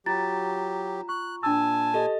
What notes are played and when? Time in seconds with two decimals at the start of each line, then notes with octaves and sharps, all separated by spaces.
0.06 F#3 F4 G4 A#5 A6
1.09 C#6 F#6
1.43 A#2 D4 G#5 A5 E6
1.94 G4 A4 D#5